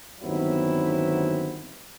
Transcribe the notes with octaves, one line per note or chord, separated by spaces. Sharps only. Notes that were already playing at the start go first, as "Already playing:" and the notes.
G1 D#2 F#3 B3 C4 E4